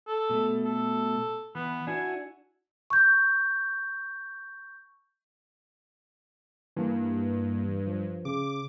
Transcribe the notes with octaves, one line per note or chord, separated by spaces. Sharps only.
A4
B2 A3
A4
E3 B3
D4 E4 F#4 G#5
C#6 G6
G2 E3 A#3
F3
C#3 D6